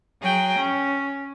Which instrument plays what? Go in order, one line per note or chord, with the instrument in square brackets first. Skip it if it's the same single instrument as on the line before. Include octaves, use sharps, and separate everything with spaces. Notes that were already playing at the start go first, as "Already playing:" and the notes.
[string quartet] F#3 G#4 G5
C#4